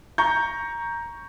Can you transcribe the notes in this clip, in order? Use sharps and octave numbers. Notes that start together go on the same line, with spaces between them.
A#5 C#6 G6